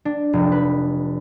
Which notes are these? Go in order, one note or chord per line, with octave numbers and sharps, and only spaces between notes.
D4
F1
B4